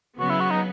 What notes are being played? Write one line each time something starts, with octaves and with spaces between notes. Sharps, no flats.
C#3 F#3 B3 F#4
E4
F#4
D#4